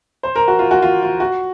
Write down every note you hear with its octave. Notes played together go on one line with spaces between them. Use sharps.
C5
A#4
F#4
F4
F#4
F4
F4
F#4